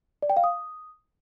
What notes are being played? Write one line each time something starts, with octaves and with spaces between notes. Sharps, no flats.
D5
G5
F5
D#6